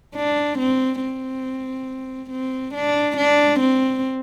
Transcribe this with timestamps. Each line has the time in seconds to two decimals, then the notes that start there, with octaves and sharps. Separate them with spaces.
0.15 D4
0.59 C4
1.02 C4
2.30 C4
2.74 D4
3.17 D4
3.60 C4